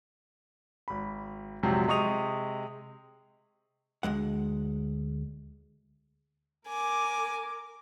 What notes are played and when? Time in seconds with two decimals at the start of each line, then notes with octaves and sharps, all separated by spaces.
0.88 G#1 B5
1.63 A#1 F2 G#2 C3 F#3
1.88 C3 G#3 C#6 D#6 F7
4.03 D2 G2 G#3 F#5
6.67 A#4 G#5 D6